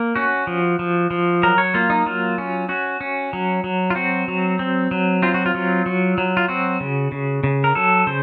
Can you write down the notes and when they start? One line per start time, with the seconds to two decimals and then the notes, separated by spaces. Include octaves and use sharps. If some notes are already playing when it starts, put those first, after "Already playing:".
Already playing: A#3
0.16 C#4 F#4
0.47 F3
0.79 F3
1.11 F3
1.43 F#3 A#4
1.58 C#5
1.74 A#3 F4
1.90 D#4
2.06 F#3 F4
2.38 C#4
2.69 C#4 F#4
3.01 C#4
3.33 F#3
3.64 F#3
3.90 F4
3.95 C4 F#4
4.28 F#3
4.59 C4
4.91 F#3
5.22 C4 F4
5.34 F#4
5.46 F4
5.55 F#3
5.86 F#3
6.18 F#3
6.37 F4
6.48 C4 F#4
6.80 C#3
7.12 C#3
7.44 C#3
7.64 A#4
7.75 F#3 A4
8.07 C#3 C5